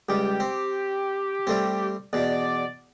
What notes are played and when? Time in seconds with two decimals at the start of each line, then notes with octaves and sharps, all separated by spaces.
0.09 C#2 G3 G4
0.40 C4
1.47 G3 A3 C4
2.13 E2 B2 D5